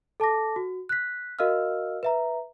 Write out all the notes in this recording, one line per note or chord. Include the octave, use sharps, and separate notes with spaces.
A4 A5 D6 A#6
F#4
F#6 B6
F#4 A#4 D#5 F5 E6 F6
B4 E5 A#5